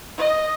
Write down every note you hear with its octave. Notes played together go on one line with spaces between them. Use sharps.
D#5